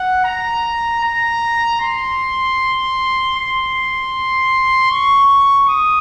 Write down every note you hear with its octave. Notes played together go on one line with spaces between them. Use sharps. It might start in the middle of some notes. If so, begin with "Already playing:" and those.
Already playing: F#5
A#5
A#5
C6
C6
C#6
D#6